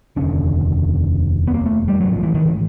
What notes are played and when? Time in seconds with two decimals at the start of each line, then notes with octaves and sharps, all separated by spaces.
0.16 F1 D#2 D3 C#4
1.47 B3
1.54 A#3
1.66 A3
1.88 G3
2.00 A1 G#2 F#3
2.12 F3
2.23 E3
2.35 D#3
2.46 E3